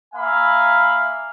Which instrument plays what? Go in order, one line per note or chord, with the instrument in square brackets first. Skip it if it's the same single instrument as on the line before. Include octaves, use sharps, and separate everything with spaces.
[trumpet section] A#3 E5 F5 G#5 B5